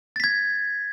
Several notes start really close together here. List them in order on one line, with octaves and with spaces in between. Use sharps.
A6 B6 G#6